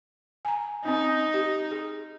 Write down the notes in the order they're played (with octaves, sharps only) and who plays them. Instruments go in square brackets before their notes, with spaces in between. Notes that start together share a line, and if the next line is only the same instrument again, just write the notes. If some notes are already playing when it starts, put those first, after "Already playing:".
[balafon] G#5 A#5
[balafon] C4 C#4 [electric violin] D#4
[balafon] G4
G#4